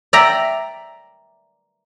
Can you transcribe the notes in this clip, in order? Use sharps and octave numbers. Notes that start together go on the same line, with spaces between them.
D5 E5 G5 A#5